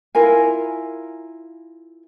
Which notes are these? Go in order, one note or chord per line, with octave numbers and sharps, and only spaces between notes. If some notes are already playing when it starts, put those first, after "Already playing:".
E4 F4 A#4 G#5